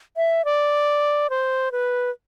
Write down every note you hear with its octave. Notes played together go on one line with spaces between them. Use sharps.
E5
D5
C5
B4